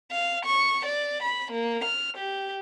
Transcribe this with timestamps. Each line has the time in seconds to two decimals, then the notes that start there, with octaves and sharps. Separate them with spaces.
0.12 F5
0.45 C#6
0.86 D5
1.23 B5
1.51 A#3
1.84 F6
2.17 G4